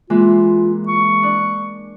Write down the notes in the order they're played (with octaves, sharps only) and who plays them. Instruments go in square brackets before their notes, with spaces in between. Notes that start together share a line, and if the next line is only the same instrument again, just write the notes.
[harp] E3 G#3 A#3 [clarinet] F4
[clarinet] C#6
[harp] D4